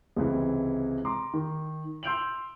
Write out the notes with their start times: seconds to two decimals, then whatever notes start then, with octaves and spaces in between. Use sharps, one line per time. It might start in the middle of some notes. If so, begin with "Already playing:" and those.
0.16 C#2 C3 E3
1.05 A#5 C6 D6
1.34 D#3
2.03 C6 E6 G6 D7 F7 F#7